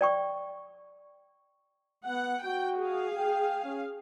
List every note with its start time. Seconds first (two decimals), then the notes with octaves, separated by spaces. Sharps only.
0.01 D5 G5 C#6
2.07 B3 F#5
2.45 F#4 G5
2.79 G#4 F5
3.17 G5
3.64 C#4